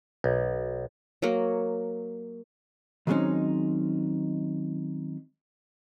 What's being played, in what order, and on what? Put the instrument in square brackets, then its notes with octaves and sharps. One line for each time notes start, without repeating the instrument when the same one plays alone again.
[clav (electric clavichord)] B1
[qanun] F#3 A#3
[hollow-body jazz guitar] D#3 F#3 G#3 C4 C#4 D#4